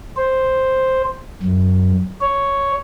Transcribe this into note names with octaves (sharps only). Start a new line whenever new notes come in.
C5
F#2
C#5